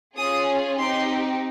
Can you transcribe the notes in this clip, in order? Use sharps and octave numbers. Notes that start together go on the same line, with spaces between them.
C#4 F4 G#4 D#6
C4 D#4 G4 C6